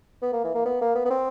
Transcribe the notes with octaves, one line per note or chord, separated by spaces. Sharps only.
B3
A#3
E3
A#3
B3
A#3
B3
B3
C4